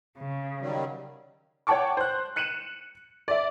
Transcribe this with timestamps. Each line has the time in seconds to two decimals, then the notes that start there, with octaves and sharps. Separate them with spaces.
0.19 C#3
0.60 D#3 F#3 G3
1.67 C#5 F#5 G5 A5 C#6 D6
1.97 C5 F#6
2.36 F#6 C#7 D#7 E7 F#7
3.28 D5 E5